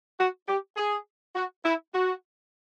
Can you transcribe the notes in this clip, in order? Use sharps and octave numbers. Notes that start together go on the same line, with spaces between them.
F#4
G4
G#4
F#4
E4
F#4